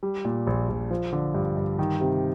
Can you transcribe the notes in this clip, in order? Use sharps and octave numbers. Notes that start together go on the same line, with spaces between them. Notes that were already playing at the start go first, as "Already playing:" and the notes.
G3
A#2
A#1
A#1
F3
D3
G2
G2
D#3
C3